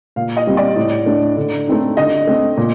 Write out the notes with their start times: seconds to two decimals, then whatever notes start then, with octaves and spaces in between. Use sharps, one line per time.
0.16 A#2 F5
0.37 D#5
0.47 G3 C4
0.57 D5
0.76 A2
1.06 A3 D4
1.37 D3
1.68 A3 C4 D#4
1.97 D3 D#5
2.27 A3 C4
2.57 A#2